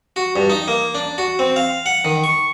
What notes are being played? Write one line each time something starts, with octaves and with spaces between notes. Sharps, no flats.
F#4
G2
D#4
A#3
D4
F#4
C4
F5
F#5
D#3
C#6